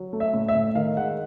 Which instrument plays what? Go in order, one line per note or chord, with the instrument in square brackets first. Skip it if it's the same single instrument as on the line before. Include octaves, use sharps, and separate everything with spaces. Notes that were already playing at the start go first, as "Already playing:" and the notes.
Already playing: [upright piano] F#3
A3
E5
A2
E5
A2
D#3 F5
G#3 F#5